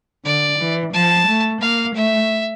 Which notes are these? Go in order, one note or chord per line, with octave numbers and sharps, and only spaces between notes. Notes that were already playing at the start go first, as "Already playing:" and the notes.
D3 D5
E3
F3 A5
A3
A#3 F5
A3 E5